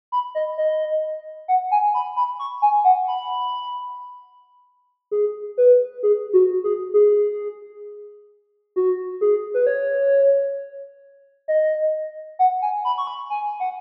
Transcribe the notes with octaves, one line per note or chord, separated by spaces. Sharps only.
B5
D#5
D#5
F#5
G#5
B5
B5
C#6
G#5
F#5
B5
G#4
B4
G#4
F#4
G#4
G#4
F#4
G#4
B4
C#5
D#5
F#5
G#5
B5
C#6
B5
G#5
F#5